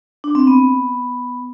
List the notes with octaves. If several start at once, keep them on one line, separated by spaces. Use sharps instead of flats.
D4
C4
B3